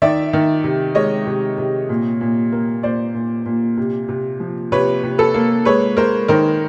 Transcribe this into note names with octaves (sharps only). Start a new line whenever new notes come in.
D#3 D5 E5
D#3
C3
G#3 C#5 D#5
C3
C3
A#2
A#2
A#3
A#2 C5 D5
A#2
A#2
C3
C3
F3
C3 B4 C#5
C3
A4 B4
A#3
G#3 B4 C#5
G#3 A#4 C5
D#3 A#4 C5